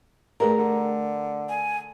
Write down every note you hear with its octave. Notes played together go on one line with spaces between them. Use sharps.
G2 A3 G#4 A#4 A#5
D3
G#5